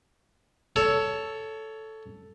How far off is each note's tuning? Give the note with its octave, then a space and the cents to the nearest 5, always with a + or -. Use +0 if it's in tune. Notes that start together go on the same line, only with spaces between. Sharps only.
A4 +0 C#5 +20